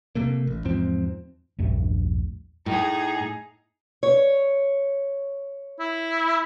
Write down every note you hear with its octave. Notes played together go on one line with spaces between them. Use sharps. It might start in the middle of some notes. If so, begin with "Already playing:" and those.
C3 A3 A#3
A1
E2 G#2 F3 C4
A#1 E2 G2 A3
A2 D#4 G#4
C#5
E4